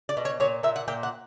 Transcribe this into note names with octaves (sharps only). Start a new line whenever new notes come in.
D5
B2
C#5
A#2 C#5
A#2 E5
F#5
A#2 G5
F#5